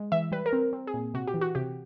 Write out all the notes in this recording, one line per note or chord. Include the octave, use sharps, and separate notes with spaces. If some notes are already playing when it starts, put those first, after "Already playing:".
Already playing: G#3
E3 E5
G3 B4
A#4
C4
C4
G#4
A#2
C3 F#4
G4
E3
F#4
C3 G4